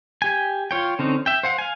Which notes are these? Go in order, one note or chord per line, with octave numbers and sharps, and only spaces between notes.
G4 G#5
F4 C#5 G5
D3 C4 C#4 D#4
E5 G5
C5 F5 F#5
F5 G#5